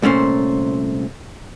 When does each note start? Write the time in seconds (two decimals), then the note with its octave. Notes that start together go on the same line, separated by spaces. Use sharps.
0.02 C2 A#2 A3 C#4 C5